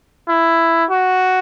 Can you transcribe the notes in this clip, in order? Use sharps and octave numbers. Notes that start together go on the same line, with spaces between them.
E4
F#4